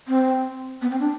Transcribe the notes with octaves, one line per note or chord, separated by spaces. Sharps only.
C4
B3
C4
D4